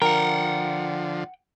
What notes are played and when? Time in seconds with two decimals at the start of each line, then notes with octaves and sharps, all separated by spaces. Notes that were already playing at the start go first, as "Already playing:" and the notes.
0.02 D3 F3 A#4 F#5 G5